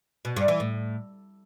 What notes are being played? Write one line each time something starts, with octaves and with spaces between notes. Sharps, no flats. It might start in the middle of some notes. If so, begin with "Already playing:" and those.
B2
G2
E3
A2